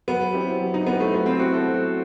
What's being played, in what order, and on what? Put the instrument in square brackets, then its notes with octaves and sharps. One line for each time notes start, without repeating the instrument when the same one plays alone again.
[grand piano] F#3 [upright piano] B3
[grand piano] C4 E4 G4
F#3
[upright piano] D#4
[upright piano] B3 [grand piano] C4 E4 G4
[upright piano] A3
[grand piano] F#3 [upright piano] B3
[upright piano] C4
[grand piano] C4 E4 G4 [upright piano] F#4
[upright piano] A4
[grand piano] F#3